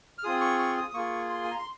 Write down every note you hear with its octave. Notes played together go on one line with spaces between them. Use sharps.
F6
C4 F4 G#4 D#6
C#6
C#6
D#6
D#6
A#3 F4 G#4 C#6
C6
G#5
A#5
C6